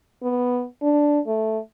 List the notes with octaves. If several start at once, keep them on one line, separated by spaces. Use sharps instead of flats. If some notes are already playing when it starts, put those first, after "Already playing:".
B3
D4
A3